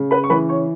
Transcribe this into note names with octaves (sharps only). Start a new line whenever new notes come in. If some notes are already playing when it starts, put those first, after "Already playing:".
Already playing: C#3
B4 B5
C#6
E3 B4 B5
C#5 C#6